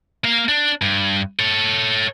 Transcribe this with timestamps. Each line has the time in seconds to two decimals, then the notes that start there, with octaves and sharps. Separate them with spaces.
0.24 A#3 F5
0.49 D4
0.82 G2
1.39 A4 C#5